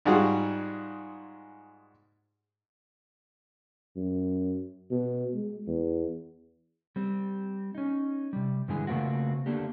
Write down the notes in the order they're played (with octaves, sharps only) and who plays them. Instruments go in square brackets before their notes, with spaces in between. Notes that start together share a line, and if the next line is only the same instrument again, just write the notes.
[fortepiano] G#2 G3 F4 F#4 G#4
[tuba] F#2
B2
G#3
E2
[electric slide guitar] G3 C4
C#4 D#4
C3 G3
G2 D3 E3 G#3 G#4
C#3 A3 A#3 C4 F4 F#4
D3 A3 A#3 D4 G4